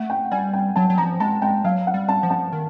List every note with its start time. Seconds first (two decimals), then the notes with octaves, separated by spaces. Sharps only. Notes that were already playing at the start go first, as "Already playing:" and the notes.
Already playing: A3 F#5
0.10 G5
0.31 G3 G#5
0.53 G5
0.76 F#3 A5
0.90 F#3
0.97 F3 A#5
1.20 G#3 A5
1.42 G#3 G5
1.64 F#3 F5
1.87 F#5
1.94 G3
2.08 A5
2.23 F3
2.30 A5
2.53 D#3